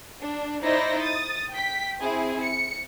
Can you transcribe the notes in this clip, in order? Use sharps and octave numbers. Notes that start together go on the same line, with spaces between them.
D4
D#4 E4 C5 D5 A#6
D#6 A6
G5 B6
C4 E4 G#4
C#7